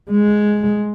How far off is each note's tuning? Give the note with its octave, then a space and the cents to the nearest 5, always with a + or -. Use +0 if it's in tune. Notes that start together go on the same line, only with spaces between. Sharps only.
G#3 +5